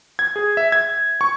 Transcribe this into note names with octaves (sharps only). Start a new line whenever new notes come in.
G#6
G#4
E5
G#6
C#6